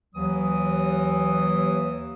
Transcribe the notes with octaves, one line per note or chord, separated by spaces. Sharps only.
D#2 E3 F#3 D#6